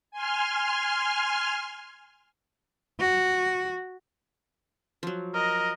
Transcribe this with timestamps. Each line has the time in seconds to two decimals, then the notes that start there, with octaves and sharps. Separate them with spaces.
0.11 G#5 C6 F6
3.00 F#4
5.03 F3 F#3
5.35 A#4 D#5